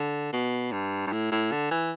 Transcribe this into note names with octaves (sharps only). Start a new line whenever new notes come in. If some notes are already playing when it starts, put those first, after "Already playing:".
Already playing: D3
B2
G2
G2
A2
A2
D3
E3